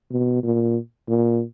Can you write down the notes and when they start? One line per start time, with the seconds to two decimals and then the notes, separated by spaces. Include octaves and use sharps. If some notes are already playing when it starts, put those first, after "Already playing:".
0.11 B2
0.43 A#2
1.09 A#2